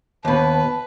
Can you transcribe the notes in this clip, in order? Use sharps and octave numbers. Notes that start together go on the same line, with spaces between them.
D#2 B2 B4 A5